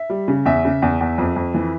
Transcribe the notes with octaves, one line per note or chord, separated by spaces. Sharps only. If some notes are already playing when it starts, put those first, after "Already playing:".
Already playing: E5
G3
C#3
E2 E5
C#3
E2
E2
F2
F2
E3